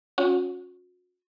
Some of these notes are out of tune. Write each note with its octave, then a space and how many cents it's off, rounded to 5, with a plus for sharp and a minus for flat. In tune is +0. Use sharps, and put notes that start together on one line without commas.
C#4 -5 F#4 -40